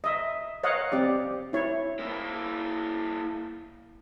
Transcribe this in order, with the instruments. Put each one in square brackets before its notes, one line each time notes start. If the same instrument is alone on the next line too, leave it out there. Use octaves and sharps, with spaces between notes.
[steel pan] D#5 E5
C#5 D#5 F5 F#5
C4 G4 D5
E4 C#5
[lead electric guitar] A#3 E4